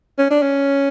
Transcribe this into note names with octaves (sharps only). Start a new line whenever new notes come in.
C#4
D4
C#4